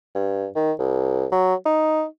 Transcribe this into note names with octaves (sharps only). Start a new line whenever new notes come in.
G2
D#3
C2
F#3
D#4